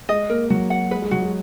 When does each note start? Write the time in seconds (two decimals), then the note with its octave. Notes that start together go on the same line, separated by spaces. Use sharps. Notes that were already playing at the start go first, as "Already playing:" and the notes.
0.09 G#3 D#5
0.30 A#3 A#4
0.50 F#3 F#4
0.70 F#5
0.91 G#3 B4
1.02 G#3
1.11 F#3 F#4
1.22 G#3